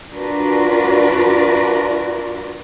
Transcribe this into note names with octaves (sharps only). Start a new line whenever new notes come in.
D4 F4 F#4 A#4 B4 D5